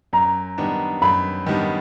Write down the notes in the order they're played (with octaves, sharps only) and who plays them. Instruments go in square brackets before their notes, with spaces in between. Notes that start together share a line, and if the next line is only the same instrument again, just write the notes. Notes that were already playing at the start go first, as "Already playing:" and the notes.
[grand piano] F#2 [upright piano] A#5
[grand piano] D#3 G3 B3 D4
[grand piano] F#2 [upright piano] B5
[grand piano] D#3 G3 B3 D4